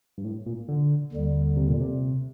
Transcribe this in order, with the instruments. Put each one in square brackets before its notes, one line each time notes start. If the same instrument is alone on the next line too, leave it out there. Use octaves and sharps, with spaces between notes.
[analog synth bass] G2
A2
A#2
D3
[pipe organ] D#2 D3 G3
[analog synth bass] C3
A#2
C3